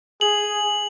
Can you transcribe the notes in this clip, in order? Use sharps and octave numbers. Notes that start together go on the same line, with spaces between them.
G#4 F#7